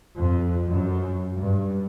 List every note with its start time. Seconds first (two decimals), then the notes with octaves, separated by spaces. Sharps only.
0.17 F2
0.70 F#2
1.36 G2